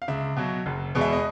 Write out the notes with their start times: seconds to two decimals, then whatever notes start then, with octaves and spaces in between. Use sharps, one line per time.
0.02 F5
0.08 C#2 E5
0.36 B2 F#3
0.66 F#1
0.95 E2 B2 G#3 B3
1.01 E5
1.13 D#5